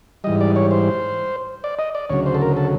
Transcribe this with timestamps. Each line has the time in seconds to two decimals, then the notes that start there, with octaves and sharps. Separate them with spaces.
0.24 G#2 E3 G3 D#5
0.41 D5
0.56 C#5
0.71 C5
1.64 D5
1.79 D#5
1.95 D5
2.10 D2 C#3 F#3 C#5
2.26 C5
2.35 A4
2.41 A#4
2.57 A4